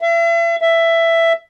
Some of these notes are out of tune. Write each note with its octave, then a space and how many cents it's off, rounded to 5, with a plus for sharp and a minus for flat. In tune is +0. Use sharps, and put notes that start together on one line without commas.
E5 +40
E5 +10